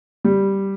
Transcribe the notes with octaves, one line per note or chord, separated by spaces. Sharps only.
G3